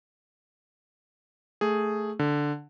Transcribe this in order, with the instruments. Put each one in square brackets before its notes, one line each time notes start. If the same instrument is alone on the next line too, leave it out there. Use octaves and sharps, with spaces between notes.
[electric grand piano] A3 G#4
D3